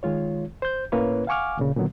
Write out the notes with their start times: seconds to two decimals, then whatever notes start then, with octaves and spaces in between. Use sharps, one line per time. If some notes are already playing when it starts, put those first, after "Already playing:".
0.03 D#3 G#3 F4 C#5
0.62 C5 G6
0.92 A2 A#3 C#4 E4 B4 C#5
1.27 F5 F#5 G#5 C#6 D6 F6
1.57 D2 A#2 C#3
1.76 A#2 D3 D#3 F#3 B3